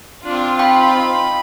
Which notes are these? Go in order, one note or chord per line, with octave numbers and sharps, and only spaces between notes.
C4 D4 F4
D#4 G5 B5 C6